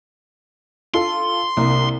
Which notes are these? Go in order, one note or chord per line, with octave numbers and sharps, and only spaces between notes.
F4 A4 C6
C2 A#3